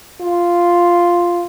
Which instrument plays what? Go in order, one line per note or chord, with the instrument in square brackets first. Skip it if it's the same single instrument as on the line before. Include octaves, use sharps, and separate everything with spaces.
[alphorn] F4